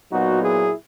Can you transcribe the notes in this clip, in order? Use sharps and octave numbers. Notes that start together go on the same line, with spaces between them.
A#2 F#3 B3 D#4 F#4
E4 G#4